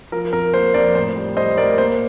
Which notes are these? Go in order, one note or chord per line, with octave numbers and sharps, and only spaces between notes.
F3 A#4
F2 A#4
A#3 C5
F2 A#4 D5
A2 C5
G3
G3 C5 D#5
A2 A#4 D5
A#3 C5